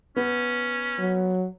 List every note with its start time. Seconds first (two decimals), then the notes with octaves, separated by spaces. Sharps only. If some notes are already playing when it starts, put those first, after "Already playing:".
0.16 B3 C#4
0.99 F#3